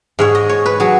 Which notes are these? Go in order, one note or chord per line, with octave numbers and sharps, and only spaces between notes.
G#2 G#3 C#5
D#5
C#5
B4
F#3 G#4